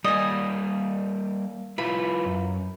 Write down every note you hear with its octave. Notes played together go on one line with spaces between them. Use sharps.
G3 A#3 D5 D#5 G#5
E4 F4 B4 B5
F#2